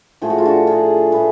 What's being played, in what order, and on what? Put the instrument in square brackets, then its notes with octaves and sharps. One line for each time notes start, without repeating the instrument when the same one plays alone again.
[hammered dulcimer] A2 F3 A3 G#4
F#4
F4
D4 F#4
F4 G#4
A2 F3 A3 G#4 B4